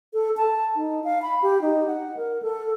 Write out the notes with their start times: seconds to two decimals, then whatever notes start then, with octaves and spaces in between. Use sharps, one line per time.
0.14 A4
0.37 A5
0.76 D#4
1.04 F5
1.22 B5
1.42 G4
1.62 D#4
1.87 F#5
2.17 A#4
2.43 A4